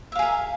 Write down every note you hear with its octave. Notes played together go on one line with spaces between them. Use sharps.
G#4 A#4 E5 F5